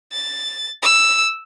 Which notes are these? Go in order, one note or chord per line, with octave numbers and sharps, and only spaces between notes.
A6
E6